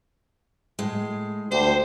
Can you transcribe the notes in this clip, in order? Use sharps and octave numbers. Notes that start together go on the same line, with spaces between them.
A2 G#3
D2 G4 C5